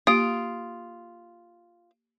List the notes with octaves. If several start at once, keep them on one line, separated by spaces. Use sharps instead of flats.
A#3 F4 G4 D#6 D7